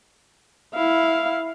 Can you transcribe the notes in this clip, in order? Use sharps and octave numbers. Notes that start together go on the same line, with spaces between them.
E4 F5